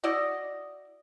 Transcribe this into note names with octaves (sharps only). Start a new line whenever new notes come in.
E4 F#4 D5 D#5